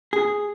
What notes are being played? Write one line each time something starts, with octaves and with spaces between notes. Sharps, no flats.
G#4